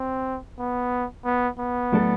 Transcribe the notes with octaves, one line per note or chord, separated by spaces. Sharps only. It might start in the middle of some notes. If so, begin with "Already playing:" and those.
Already playing: C4
B3
B3
B3
A2 F#3 A3 D4 A4